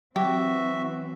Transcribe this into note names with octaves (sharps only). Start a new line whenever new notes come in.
E3 F#3 C4 F#4 G4 E5